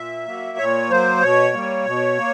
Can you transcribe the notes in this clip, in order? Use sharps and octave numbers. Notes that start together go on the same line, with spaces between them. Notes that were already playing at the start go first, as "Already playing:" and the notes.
Already playing: A#2 E5
F#3 A#3
A#2 C#5
F#3 A#3 C5
B2 C#5
G3 A#3
B2
A#3